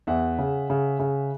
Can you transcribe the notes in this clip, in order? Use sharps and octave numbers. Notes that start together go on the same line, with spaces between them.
E2 E5 F#5
C#3
C#3
C#3